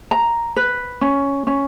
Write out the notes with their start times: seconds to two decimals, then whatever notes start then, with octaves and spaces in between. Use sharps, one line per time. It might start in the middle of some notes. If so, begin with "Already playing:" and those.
0.11 A#5
0.56 B4
1.01 C#4
1.47 C#4